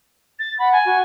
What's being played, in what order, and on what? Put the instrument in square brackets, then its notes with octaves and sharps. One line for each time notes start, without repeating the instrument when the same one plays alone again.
[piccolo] A6
[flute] F#5 [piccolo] B5
[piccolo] G#5
[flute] F#4